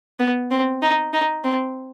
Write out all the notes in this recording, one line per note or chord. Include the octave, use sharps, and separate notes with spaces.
B3
C4
D#4
D#4
C4